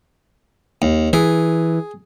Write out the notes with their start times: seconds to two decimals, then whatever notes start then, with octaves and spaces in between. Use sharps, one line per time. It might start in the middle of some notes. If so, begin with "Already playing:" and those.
0.82 D#2
1.13 E3 G#4